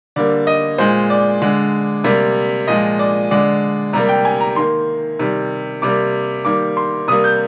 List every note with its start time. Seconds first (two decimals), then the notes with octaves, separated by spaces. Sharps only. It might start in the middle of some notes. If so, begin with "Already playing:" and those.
0.16 D3 G3 A#3 D5
0.47 D#5
0.78 A#2 G#3 C5
1.10 D5
1.42 D3 G#3
2.04 C3 G3 A#3
2.67 A#2 F3 G#3 D#5
2.99 D5
3.31 D3 G#3 D5
3.93 C3 G3 A#3 A#5
4.09 G5
4.25 G#5
4.41 A#5
4.56 D#3 A#3 C6
5.19 C3 D#3 G3
5.82 C3 G3 A#3 D6
6.45 D#3 G3 A#3 D6
6.77 C6
7.08 C3 G3 A#3 D#6
7.24 G6